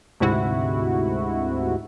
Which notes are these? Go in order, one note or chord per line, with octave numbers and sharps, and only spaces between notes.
D2 G#2 C3 E4 F#4